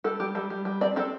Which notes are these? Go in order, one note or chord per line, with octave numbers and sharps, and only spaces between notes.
G3 A4
G3 G4
G3 A4
G3
G3
C4 D5
C4 A4